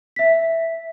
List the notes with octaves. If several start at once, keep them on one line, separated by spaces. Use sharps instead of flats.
E5 B6